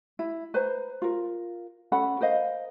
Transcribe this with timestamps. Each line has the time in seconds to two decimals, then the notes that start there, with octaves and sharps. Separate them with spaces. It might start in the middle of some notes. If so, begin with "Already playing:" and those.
0.19 E4
0.54 B4 C5 A#5
1.02 F4 A#4
1.92 C#4 A4 F#5 B5
2.21 A#4 C5 D#5 F5